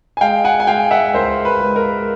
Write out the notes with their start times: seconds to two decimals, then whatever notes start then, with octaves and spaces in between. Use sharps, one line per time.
0.17 G#5
0.21 G#3 F5 G5
0.44 F#5 G#5
0.60 G#5
0.67 G#3 F5 G5
0.91 E5 F#5
1.14 C#2 A#4 C5
1.45 B4
1.61 G#3
1.76 A#4